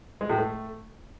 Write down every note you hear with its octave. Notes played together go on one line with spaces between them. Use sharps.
G#3
A2
A3